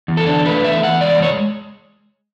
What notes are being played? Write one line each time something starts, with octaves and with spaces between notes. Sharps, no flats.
E2
A4
D4
A3 B4
E2 E5
E2 F#5
G#3 D5
G#3 C#5